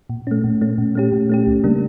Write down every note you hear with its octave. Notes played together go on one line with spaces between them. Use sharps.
A#2
A3 C#4
A#2
A3 C#4
A#2
A3 C#4 G4
A#2
A3 C#4 G4
C#2
C#3 G3 A#3 D4